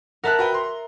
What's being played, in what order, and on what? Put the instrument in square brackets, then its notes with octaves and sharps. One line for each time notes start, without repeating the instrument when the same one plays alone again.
[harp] A#4 E5 F#6 [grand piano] F#5 A5
[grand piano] F#4 B4 G5
A#5 C6